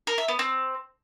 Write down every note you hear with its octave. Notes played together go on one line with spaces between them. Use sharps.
A#4
E5
B3
C4